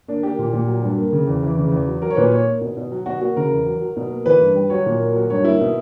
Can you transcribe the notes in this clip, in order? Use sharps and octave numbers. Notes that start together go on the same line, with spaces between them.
A#3 D4
A#3 G4
A#2
A#2
F#3
G2
A#3
C#3
E2
E3
C#3
E2
F#3
F#3 A#4
C#5
A#2 B4
A#3 C#5
A#3
B2
B2
F#3
B2 F#4
A#3 F#4
C#3 A#4
E2
F#3
F#3
B2
A#3
E3 B4
G2
G3
F#3 C#5
A#2
A#3
F#3
G2 C#5
A#3 E4
B2